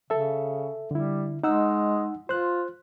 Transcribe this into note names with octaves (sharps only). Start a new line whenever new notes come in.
C#3 A4 E5
D3 G3 E4
G#3 D#4 F#5 E6
F4 C5 F#6